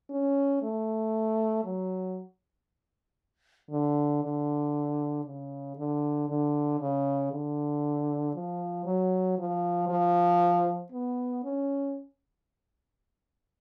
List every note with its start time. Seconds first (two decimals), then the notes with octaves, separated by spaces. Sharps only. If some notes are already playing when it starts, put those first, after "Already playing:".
0.11 C#4
0.62 A3
1.65 F#3
3.71 D3
4.23 D3
5.25 C#3
5.77 D3
6.29 D3
6.80 C#3
7.32 D3
8.35 F3
8.86 F#3
9.39 F3
9.89 F3
10.92 B3
11.44 C#4